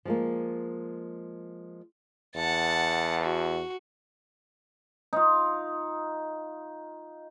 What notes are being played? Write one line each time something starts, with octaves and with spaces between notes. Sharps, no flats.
F3 G#3 A#3
E2 F#5 A5
F#4
D#4 F4